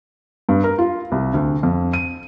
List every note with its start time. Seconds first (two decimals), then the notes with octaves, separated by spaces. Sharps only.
0.49 G2
0.64 A#4
0.78 F4
1.12 C2
1.34 D2
1.63 F2
1.93 D#7